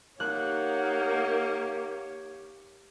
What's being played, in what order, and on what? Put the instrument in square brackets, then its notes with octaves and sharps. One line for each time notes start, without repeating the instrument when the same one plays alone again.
[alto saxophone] A#3 [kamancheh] D#4 F#5 [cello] G4 C#5 [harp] F#6